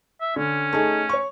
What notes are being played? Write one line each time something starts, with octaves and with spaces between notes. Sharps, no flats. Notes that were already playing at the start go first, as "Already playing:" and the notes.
E5
D3 C#4
A3 D#4 G#4
C#5 C#6